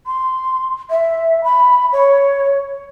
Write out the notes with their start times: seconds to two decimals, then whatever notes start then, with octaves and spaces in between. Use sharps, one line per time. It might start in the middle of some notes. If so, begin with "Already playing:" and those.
0.07 C6
0.90 E5
1.44 B5
1.93 C#5